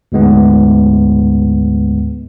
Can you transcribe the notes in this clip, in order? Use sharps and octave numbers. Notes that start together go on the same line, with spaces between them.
D2 G#2 G#3 B3